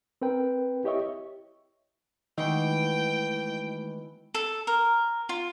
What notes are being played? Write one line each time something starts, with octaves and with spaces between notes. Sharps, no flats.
C4 A#4 B4 G5
E4 G4 C#5 D#5 E5 C#6
B2 D#3 E3 G#3 A3 E4 G5
A4
A#4
F4